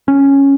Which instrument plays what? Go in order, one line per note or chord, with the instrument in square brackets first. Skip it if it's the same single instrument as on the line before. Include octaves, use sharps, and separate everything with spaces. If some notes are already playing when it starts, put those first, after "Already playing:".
[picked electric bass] C#4